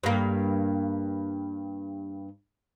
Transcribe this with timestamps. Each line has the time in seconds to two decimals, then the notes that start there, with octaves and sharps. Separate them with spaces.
0.03 G2 A#3